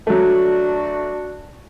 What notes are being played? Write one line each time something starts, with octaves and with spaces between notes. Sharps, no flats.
F#3 A3 D4 F#4